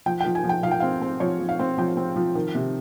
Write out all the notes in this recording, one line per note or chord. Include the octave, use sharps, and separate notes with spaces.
F3 G5
G5
F3
G#5
F3
G5
F3 F5
G5
C4 F5
C4
F3 C#5
F3
F5
C4
F3 G5
C4
F3
D#3
C3